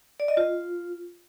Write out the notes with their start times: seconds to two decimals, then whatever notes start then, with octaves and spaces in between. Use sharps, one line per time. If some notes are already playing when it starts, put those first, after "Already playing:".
0.20 D5
0.28 D#5
0.37 F4